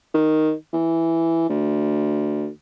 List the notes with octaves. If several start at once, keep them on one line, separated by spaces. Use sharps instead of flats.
D#3
E3
D2